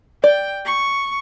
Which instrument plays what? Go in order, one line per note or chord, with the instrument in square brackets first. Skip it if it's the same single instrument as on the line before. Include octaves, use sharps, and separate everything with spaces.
[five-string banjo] D5 [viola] G5
[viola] C#6